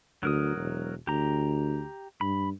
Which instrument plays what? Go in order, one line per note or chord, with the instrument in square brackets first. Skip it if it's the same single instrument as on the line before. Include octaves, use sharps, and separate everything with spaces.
[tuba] D2 [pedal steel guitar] F#3 A#4 D#6
[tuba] E1
[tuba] D2 [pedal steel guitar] G4 A#5
[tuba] G2 [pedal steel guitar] B5